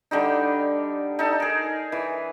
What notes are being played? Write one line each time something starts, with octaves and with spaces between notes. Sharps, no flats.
D3 G3 D#4
D#4 A4
G#4 A#4
E3